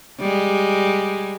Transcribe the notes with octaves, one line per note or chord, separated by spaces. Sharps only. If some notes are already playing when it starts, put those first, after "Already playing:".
G3 G#3